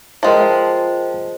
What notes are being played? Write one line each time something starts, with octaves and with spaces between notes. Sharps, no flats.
F3 G#3 A#4 G5 A5